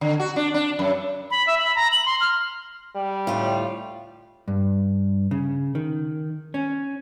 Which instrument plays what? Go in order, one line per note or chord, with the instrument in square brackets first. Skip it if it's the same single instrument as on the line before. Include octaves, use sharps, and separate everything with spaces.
[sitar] D3
F#4
D4
D4
F#2
[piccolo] B5
E5
B5
A#5
F#7
C6
F6
[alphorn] G3
[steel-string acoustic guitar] D2 A2 F4
[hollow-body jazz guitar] G2
C#3
D#3
C#4